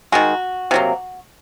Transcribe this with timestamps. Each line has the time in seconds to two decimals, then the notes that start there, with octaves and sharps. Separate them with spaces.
0.12 D#3 G#3 F#4
0.71 C3 F#3 A#3